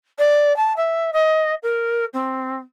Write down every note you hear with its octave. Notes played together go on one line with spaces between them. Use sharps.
D5
A5
E5
D#5
A#4
C4